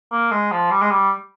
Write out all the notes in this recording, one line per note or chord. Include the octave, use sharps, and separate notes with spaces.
A#3
G#3
F3
G3
G#3
G3